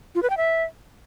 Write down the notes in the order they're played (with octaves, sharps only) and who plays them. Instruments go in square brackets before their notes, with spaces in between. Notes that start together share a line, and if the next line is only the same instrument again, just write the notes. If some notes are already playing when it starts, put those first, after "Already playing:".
[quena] F4
B4
G5
E5